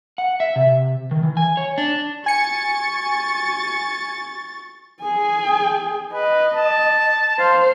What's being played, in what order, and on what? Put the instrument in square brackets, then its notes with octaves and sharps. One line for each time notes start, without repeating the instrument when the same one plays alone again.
[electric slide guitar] F#5
E5
C3
D#3
E3
G#5
C#5
D4
[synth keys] G#5 C#7 [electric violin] C#6 A6
[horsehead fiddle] G#4 G#5
[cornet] B4 [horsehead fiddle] D#5
[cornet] A5
[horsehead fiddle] C5 [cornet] F5